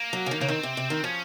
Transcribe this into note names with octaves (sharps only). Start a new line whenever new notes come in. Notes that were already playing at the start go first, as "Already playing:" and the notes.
Already playing: A#3
F#3
C#3
D#3
C#3 A#3
D#3 C4
C3
C3
D#3
F3 C#4